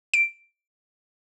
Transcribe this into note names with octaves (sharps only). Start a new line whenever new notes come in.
D7